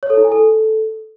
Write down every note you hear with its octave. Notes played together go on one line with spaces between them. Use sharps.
C#5
A4
E4
G#5
A4